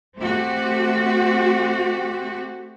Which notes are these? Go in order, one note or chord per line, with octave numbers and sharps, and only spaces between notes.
A3 C4 F#4 G4